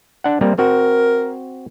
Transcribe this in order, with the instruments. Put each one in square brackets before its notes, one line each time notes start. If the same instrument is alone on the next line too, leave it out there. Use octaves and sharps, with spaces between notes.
[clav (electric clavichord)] D4 F#5
G3 A#3 C4
[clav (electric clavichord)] C4 F#4 [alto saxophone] A#4